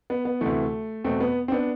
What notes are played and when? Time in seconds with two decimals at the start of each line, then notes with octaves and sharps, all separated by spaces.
0.10 B3
0.25 B3
0.41 D2 C3 E3 A3
1.04 E2 B2 A3 C4
1.20 B3
1.48 C4
1.52 B3 D4